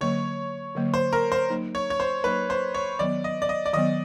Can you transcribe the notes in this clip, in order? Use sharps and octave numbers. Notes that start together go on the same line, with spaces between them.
D3 F#3 A#3 C#5
D3 F#3 A#3
C5
A#4
C5
F#3 A#3 D#4
C#5
C#5
C5
F#3 A#3 D#4 B4
C5
C#5
D#3 F#3 B3 D5
D#5
D5
D#5
D5
D#3 F#3 B3 D#5